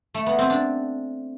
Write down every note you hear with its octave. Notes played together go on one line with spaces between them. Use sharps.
A3
B3
C4
D4